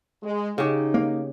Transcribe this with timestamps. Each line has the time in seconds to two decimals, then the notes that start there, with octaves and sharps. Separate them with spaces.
0.23 G#3
0.58 C#3 D#4 G4
0.94 A#3